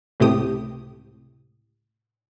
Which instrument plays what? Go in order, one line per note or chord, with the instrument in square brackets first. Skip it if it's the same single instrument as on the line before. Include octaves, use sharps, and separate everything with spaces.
[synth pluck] C#2 A2 C3 G4 D#6